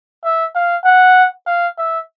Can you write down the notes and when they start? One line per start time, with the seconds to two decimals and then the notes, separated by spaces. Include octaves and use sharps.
0.24 E5
0.55 F5
0.85 F#5
1.46 F5
1.78 E5